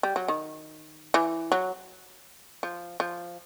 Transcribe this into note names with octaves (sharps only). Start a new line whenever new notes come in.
G3
F#3
D#3
E3
F#3
F3
F3